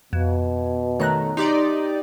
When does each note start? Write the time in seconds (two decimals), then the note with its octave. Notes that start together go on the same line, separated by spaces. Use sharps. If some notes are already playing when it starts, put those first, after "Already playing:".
0.13 F2 B2
1.00 D#3 A3 C#5 A#5 F#6
1.37 D#4 G4 D5 C6